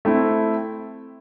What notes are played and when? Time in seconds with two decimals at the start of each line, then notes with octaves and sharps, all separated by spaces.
0.05 A3 C4 E4